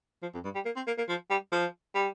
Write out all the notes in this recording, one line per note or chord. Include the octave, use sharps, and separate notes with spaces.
F3
F2
G2
G3
A#3
C4
A#3
A#3
F3
G3
F3
G3